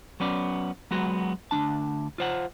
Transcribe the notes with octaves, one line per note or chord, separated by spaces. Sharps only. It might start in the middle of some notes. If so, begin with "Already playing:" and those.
F#3 B3 C#4 D5
F#3 G#3 B3 F#4
D2 D#3 D4 A5
F4 C5 F#5